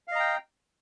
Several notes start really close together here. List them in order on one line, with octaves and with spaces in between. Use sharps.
F5 D#5 A#5 G5